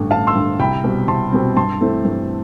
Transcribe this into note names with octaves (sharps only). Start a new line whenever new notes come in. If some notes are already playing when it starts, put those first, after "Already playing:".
Already playing: A1 G2 D3
A1 F5 A5
C6 E6
G2 D3
C2 G5 B5
B2 G3 C4
C2 A5 C6
B2 G3 C4
G2 A5 C6
E3 A3 C4
G2